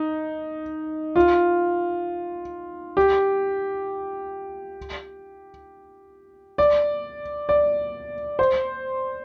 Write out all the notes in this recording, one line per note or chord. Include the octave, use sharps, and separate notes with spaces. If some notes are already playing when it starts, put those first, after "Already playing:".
Already playing: D#4
F4
G4
D5
D5
C5